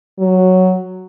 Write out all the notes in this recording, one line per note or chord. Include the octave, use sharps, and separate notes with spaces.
F#3